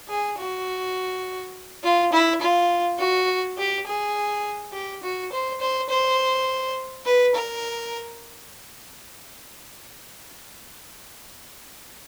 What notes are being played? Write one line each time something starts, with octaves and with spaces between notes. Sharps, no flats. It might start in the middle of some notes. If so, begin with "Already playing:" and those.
G#4
F#4
F4
E4
F4
F#4
G4
G#4
G4
F#4
C5
C5
C5
B4
A#4